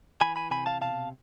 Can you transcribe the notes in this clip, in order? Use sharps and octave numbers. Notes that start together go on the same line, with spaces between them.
E3 G#5 B5
G#5 B5
C3 G#5 B5
F5 A5
B2 F5 A5